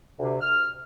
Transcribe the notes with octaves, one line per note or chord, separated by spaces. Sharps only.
D2 C3
F6